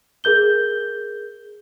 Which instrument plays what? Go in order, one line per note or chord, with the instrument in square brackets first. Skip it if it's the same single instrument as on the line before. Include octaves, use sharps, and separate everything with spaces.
[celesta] G#4 A#4 G6 G7